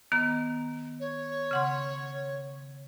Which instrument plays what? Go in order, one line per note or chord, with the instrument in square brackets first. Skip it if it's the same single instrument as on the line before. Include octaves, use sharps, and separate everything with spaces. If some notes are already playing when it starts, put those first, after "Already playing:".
[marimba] D#3 B3 A#5
[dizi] C#5
[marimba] C#3 F#5 C6